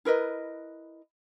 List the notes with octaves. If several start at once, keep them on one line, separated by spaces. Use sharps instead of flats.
E4 A#4 B4 D#5